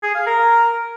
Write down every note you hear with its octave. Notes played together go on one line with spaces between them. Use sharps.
G#4
F5
A#4